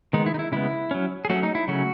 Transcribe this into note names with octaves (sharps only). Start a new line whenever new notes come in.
D#3 G#3 B3 D#4
E4
D#4
E4
C#3 G#3 B3 E4
F#3 C#4
G#4
F#3 A3 C#4 F#4
D#4
E4
C#3 F#3 A3 C#4 F#4